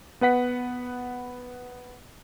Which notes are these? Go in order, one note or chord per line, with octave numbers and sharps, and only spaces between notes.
B3 B4 F#5 B6